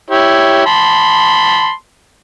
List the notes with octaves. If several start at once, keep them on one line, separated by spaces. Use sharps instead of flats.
E4 G4 C#5
A5 B5 C6